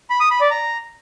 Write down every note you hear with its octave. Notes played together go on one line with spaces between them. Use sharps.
B5
D#6
B5
D5
A#5